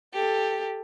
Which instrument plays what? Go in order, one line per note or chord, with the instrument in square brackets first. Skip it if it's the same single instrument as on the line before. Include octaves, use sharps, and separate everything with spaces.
[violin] G4 A4